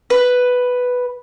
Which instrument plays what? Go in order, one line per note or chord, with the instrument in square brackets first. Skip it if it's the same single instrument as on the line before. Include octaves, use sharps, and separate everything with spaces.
[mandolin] B4